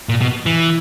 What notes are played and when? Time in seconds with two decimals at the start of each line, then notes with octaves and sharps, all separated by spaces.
0.09 A#2
0.21 B2
0.46 E3